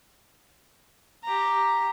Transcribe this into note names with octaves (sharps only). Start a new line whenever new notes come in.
G4 A#5